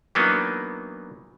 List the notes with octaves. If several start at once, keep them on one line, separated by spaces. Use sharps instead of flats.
E3 F#3 A#3 B3 D4 D#4